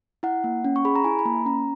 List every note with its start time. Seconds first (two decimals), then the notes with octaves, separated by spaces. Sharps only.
0.23 E4 F#5
0.44 A#3
0.64 C#4
0.76 C#6
0.85 G#4 B5
0.95 A#5
1.04 E4 G#5
1.19 B5
1.25 A#3 A#5
1.46 C#4 A#5